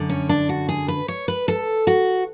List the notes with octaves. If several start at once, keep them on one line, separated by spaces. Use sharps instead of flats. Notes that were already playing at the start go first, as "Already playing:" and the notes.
Already playing: F#2 D3
C#4
D4
F#4
G#4
B4
C#5
B4
A4
F#4